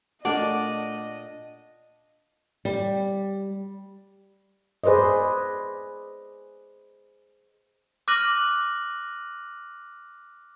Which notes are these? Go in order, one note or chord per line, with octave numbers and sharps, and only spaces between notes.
A#2 A3 D4 D5 D#5 F#5
G3
G#4 B4 C5 D5 D#5
D6 F6 F#6 A#6 D#7 F#7